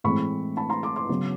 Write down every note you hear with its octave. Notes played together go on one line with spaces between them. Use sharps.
A2 E3 G#3 C4 B5 C#6
A5 B5
A#5 C6
C6 D6
C6 D6
C#3 F#3 B3